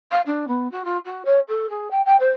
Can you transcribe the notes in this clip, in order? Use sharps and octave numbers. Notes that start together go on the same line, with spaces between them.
F5
D4
B3
F#4
F4
F#4
C#5
A4
G#4
G5
G5
C5